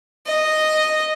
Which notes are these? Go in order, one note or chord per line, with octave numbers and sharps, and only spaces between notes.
D#5